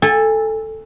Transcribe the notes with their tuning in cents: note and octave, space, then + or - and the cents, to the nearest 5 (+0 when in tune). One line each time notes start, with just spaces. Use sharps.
A4 +0 G#5 -30